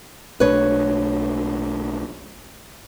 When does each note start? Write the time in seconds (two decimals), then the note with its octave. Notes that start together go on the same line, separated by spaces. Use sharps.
0.40 B1 A3 D4 B4 C#5